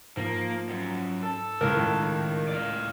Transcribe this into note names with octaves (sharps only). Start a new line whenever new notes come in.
G#2 F3 A#3
F#2
A4
C#2 A2 A#4
D#3
D5 F5